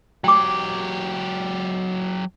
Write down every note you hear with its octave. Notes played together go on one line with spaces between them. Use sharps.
F#3 G4 G5 D6